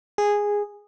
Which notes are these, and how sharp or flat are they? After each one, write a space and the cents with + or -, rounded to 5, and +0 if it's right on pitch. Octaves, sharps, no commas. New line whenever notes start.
G#4 -10